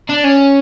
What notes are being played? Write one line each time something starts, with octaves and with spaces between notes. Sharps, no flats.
D4
C#4